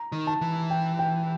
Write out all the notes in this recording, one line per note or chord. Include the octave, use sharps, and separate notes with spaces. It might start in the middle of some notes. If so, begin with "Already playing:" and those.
Already playing: A#5
D#3
A5
E3
G5
G5